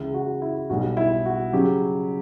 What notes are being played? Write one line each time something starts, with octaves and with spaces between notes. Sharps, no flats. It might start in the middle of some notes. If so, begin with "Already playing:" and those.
Already playing: C#2 C#3 E3 E4
F#4
E4
B1 B2 G3 F#4
E4
F#4
C#3 F#3 G4